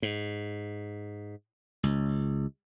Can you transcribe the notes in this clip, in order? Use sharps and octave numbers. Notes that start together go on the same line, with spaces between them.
G#2
C#2